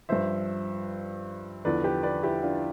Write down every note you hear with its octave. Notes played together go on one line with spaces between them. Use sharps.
G2 F3 C5 E5
E2 D3 F3 B4 D5
G4 B4
B4 D5
E4 G4
D4 F4